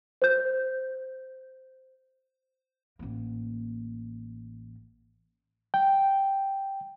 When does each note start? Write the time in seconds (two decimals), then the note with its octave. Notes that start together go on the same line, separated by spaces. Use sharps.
0.22 C5 G6
2.99 A1 A#3
5.74 G5